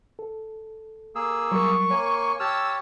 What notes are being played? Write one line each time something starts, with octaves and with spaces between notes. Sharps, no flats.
A4
A#3 G#4 E6
F#3 G3 A#4 C#6
A#3 C#5 G#5
G4 C#5 A5 E6 F6